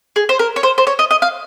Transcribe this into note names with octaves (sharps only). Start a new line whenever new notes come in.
G#4
C5
A#4
C#5
C5
C5
C#5
D#5
D#5
F5